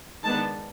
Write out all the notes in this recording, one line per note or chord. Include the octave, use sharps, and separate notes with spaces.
D#3 G#3 B3 D4 A5